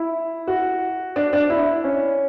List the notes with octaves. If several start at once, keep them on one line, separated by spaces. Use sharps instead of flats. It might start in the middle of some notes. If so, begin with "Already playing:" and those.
Already playing: E4
F#4
D4
D4
E4
C#4